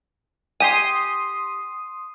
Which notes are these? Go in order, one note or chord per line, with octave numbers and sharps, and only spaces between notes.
G4 G#5 C6 D#6